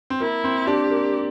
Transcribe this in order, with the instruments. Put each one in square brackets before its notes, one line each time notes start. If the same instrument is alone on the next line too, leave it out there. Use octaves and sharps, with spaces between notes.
[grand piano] C4
[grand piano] A#3 [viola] E4
[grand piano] C4
[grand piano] D4 [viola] G4
[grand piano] A#3